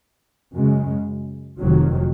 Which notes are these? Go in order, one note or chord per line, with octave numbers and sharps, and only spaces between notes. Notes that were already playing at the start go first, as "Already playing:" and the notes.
F#2 C#3 G#3
F1 F2 C3 D#3 F#3